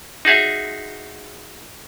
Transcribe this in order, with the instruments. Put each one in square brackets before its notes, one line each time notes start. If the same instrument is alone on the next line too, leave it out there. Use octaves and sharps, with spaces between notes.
[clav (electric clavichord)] D#4 F#4 G#4 E5